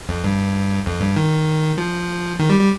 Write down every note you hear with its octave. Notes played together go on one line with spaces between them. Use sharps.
F2
G2
F2
G2
D#3
F3
D#3
G3
G3